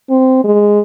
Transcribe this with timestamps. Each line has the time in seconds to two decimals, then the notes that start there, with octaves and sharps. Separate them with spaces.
0.10 C4
0.44 G#3